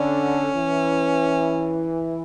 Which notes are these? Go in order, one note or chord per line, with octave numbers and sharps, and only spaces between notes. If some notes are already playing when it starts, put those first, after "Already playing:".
Already playing: D3 C#4
E3